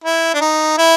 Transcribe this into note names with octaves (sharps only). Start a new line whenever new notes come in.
E4
D4
D#4
E4